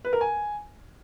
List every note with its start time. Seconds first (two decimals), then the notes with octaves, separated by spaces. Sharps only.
0.05 B4
0.13 A#4
0.21 G#5